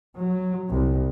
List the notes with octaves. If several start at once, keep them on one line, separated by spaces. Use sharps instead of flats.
F#3
C2